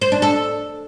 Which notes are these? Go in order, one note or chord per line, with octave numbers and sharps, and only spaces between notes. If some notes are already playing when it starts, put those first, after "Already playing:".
C5
D4
A4